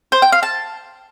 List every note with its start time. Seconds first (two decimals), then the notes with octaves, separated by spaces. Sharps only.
0.12 C5
0.22 G5
0.32 F5
0.43 A5